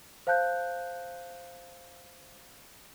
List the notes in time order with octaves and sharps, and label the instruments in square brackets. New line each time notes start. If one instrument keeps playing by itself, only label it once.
[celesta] C5 F5 A5 F#6 G6